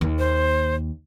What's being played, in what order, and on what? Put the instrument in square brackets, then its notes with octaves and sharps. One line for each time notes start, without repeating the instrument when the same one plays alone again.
[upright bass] D#2
[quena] C5